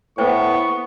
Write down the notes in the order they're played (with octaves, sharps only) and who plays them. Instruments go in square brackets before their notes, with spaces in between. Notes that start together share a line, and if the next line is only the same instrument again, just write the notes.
[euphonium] A2 [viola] B3 [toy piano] B4 C5 G5 [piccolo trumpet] C#6